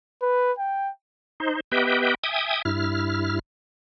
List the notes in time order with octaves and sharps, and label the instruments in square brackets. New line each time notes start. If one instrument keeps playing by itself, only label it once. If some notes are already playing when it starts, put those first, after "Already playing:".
[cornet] B4
G5
[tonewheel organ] D#4 C5
B3 G4 B4 D#5 E5 G5
E5 G5 G#5 D#6
G2 E4 F6